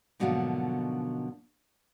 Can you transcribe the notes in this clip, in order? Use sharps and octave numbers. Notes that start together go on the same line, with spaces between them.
G#2 B2 D3 F3 F#3 A#3